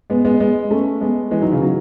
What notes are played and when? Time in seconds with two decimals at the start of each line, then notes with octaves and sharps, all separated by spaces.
0.10 G#3 B3
0.25 G#3 B3
0.40 G#3 B3
0.71 A3 C#4
1.01 G#3 B3
1.31 E3 G#3
1.42 D#3 F#3
1.52 C#3 E3
1.62 D#3 F#3